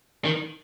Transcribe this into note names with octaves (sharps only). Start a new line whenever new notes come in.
D#3